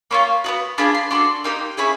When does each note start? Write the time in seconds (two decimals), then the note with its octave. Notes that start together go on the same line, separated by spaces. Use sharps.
0.11 A#3 C#4 F4 B5
0.44 B3 D#4 F#4
0.78 D4 F4 G#4 B5
0.95 C6
1.11 D4 F#4 A4 C6
1.44 A#3 D#4 G4
1.77 C#4 E4 G#4 B5